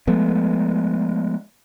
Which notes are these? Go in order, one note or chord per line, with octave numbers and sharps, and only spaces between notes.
F3 G#3 A3 B3